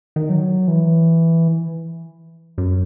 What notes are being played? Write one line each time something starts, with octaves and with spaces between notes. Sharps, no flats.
D#3
F#3
E3
F#2